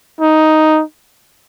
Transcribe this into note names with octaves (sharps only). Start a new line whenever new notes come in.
D#4